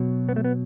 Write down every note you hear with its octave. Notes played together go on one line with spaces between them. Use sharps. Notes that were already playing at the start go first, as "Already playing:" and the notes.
Already playing: B2 F#3
B3
A3
B3